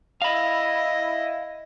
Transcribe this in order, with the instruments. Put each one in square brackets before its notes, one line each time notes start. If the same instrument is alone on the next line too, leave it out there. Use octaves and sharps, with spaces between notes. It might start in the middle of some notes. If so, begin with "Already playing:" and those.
[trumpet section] E4 [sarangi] D#5 [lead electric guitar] F5 B5